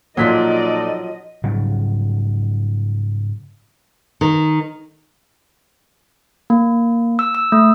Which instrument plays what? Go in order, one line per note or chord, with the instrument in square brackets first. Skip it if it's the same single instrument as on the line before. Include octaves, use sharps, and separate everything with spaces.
[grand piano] A#2 B6 [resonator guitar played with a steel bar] F3 F#3 [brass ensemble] D#4 A4 D5 [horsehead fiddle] D#5
[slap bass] G#2 C#3 F#3 G3
[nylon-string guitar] D#3
[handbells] A#3
E6
E6
A3